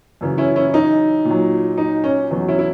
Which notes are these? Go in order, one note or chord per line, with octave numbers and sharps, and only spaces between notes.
F#2 C#3 E3
C#4 E4
C#4 E4
D#4
A#2
F#3
D#4
C#4
E2 B2 F#3
C#4 E4
E4